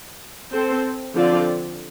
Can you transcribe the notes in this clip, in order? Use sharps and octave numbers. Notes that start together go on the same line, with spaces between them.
C4 A4 C5
D3 F3 C4 F4 D5